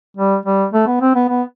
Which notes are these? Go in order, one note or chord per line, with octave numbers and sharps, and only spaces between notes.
G3
G3
A3
B3
C4
B3
B3